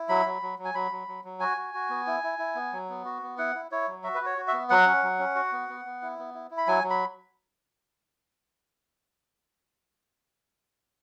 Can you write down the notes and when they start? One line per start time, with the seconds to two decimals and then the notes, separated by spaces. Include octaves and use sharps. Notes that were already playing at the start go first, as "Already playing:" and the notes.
Already playing: E4
0.09 F#3 B5
0.26 F#3
0.42 F#3
0.59 F#3
0.65 G#5
0.74 F#3 B5
0.91 F#3
1.08 F#3
1.24 F#3
1.40 F#4 G#5
1.57 F#4
1.74 F#4
1.89 B3
2.07 E4
2.23 E4
2.39 E4
2.55 B3
2.73 F#3
2.89 B3
3.05 F#4
3.22 B3
3.38 E4 F#5
3.55 E4
3.71 E4 C#5
3.88 F#3
4.03 F#4 E5
4.15 B4
4.21 F#4 C#5
4.38 F#4
4.48 E5
4.53 B3
4.70 F#3 F#5
4.86 C#4
5.03 F#3
5.19 C#4
5.35 F#4
5.52 B3
5.69 B3
5.85 B3
6.02 E4
6.19 B3
6.34 E4
6.51 E4
6.57 B5
6.67 F#3 G#5
6.84 F#3
6.90 B5